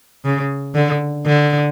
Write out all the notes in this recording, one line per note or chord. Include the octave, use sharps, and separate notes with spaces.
C#3
D3
D3